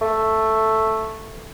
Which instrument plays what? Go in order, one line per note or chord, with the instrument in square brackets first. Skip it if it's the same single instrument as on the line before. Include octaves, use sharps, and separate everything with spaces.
[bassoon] A3